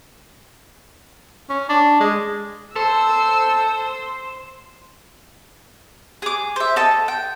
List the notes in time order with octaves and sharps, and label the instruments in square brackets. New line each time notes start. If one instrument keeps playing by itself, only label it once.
[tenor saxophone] C#4
D4
G#3
[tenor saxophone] A4 [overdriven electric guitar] C5 [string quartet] E6
[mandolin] G#4 D6
C5 E5
A4 D#5 A5
G5